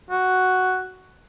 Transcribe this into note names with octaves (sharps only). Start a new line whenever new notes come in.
F#4